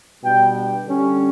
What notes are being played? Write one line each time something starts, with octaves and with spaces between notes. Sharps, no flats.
B2 G3 B3 D4 G5
G5
D3 G3 C#4